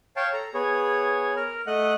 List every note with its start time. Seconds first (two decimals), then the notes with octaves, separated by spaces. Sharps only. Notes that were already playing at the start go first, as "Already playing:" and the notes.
0.16 C#5 F5 G5 A5
0.33 A4 A#5
0.54 B3 G#4 C#5
1.36 A#4 F6
1.67 A3 D#5 F#5 F#6